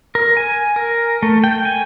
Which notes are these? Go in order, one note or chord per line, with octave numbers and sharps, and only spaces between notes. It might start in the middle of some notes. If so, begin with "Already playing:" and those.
A#4
G#5
A#4
A3
G5
G#5